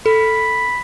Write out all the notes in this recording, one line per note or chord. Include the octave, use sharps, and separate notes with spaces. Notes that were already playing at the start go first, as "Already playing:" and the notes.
A4 B5